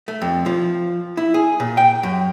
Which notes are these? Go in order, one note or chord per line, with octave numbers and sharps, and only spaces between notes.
A3
F2
F3
E4
G#4
A#2
G5
F#2